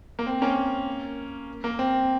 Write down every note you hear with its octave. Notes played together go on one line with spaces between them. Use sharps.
A#3
C4
A#3 C#4
A#3
C4